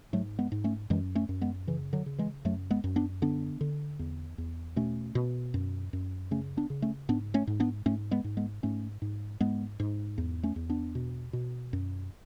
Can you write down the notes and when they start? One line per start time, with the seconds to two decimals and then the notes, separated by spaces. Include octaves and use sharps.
0.13 G#2 F#3 A3
0.39 G#3 B3
0.52 G#2
0.64 A3 C#4
0.90 F#2 E3 G#3
1.15 A3 C#4
1.29 F#2
1.41 G#3 B3
1.67 C#3 E3
1.93 D3 F#3
2.06 C#3
2.18 E3 G#3
2.45 F#2 F#3 A3
2.71 G#3 B3
2.84 F#2
2.96 B3 D4
3.22 D3 B3 D4
3.61 D3
3.99 E2
4.38 E2
4.76 B2 A3 C#4
5.15 B2
5.54 F#2
5.93 F#2
6.31 C#3 A3 C#4
6.57 B3 D4
6.70 C#3
6.82 A3 C#4
7.09 G#2 B3 D4
7.34 A3 C#4
7.47 G#2
7.60 B3 D4
7.86 G#2 A3 C#4
8.11 G#3 B3
8.24 G#2
8.37 G#3 B3
8.63 G#2 A3 C#4
9.02 G#2
9.41 G#2 G#3 B3
9.80 G#2
10.18 E2
10.43 A3 C#4
10.56 E2
10.69 B3 D4
10.95 B2
11.33 B2
11.73 F#2